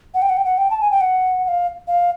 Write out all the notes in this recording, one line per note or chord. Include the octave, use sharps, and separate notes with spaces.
F#5
G5
F#5
G5
F#5
G5
A5
G#5
G5
F#5
F#5
F5
F5